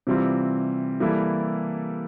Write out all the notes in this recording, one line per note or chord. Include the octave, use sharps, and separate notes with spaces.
C3 E3 G3 C4 F4
E3 G3 A#3 E4 A4